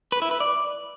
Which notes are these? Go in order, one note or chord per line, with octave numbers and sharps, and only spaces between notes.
B4
E4
B4
D5